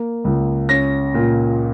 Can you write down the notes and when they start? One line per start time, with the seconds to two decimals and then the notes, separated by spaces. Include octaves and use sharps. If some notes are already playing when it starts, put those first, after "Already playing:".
Already playing: A#3
0.24 C#2
0.69 C#4 A#6
1.14 A#2